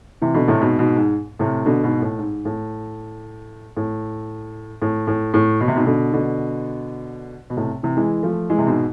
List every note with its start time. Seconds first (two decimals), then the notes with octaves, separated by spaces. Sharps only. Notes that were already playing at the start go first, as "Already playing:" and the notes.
0.22 C3 E3
0.34 B2 D3
0.48 A2 C3
0.61 G#2 B2
0.79 G#2 B2
0.96 G#2
1.39 A2 C3
1.66 B2 D3
1.84 G#2 B2
2.01 A2
2.18 G#2
2.45 A2
3.77 A2
4.82 A2
5.07 A2
5.34 A2
5.61 B2
5.68 C3
5.75 G#2 B2
5.86 B2 D3
6.13 B2 D3
7.50 B2
7.57 A2 C3
7.83 C3 E3
7.97 E3 G#3
8.23 F3 A3
8.50 E3 G#3
8.59 C3
8.67 G#2 B2